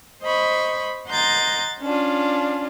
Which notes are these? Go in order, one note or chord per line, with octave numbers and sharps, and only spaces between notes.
C5 D#5 B5 C#6
D#5 F#5 A#5 C6 G6 A6
C#4 D4 F4